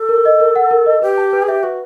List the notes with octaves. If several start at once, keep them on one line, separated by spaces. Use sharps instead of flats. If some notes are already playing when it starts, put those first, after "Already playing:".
Already playing: A4
A#4
D#5
A#4
F#5
A#4
D#5
G4 B4
A5
B4
G#4
G4 E5
F#4 B4